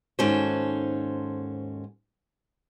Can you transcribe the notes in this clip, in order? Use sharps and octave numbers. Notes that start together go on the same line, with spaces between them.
D#2 G#2 C#4 F#4 A4 C5